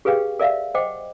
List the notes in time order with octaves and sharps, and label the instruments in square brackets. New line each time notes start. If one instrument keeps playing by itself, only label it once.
[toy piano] G4 G#4 B4 F5 G5
A#4 D5 E5 F5
C5 D#5 F#5 G5 D6